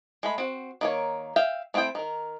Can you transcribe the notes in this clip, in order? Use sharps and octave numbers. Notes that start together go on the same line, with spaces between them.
G#3 A3 B5
C4 F#4
D#3 A#3 C#5
E5 F5 G5
A3 C4 E4 G#4 G5
D#3 A#4